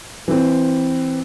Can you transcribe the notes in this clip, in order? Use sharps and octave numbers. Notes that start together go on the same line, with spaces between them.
E3 C4